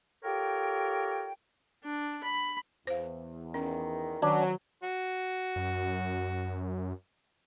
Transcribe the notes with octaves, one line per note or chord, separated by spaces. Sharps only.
F4 G4 A4 A#4 C#5 G5
D4
B5
E2 C5 F5
D#3 C#4
D#3 F#3 C#4 D4
F#4
F#2